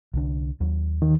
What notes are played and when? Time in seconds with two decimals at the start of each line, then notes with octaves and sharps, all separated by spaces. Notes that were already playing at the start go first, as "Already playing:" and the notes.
0.14 C2 D3 D4
0.60 D#2 F#3
1.02 D#3